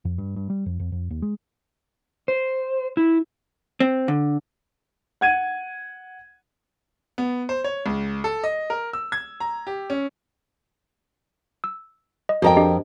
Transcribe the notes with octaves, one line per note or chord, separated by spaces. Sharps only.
F2
G2
G2
G3
F2
F2
F2
D#2
G#3
C5
E4
C4
D3
F#5 G#6 D#7
B3
C5
C#5
C#2
A4
D#5
A#4
E6
G#6
A#5
G4
C#4
E6
D#5
F2 F#4 A#4 D#5 G5
D4 G4 D#5